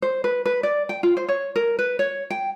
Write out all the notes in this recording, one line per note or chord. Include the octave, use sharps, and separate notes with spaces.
C5
B4
B4
D5
G5
F4
C5
C#5
A#4
B4
C#5
G5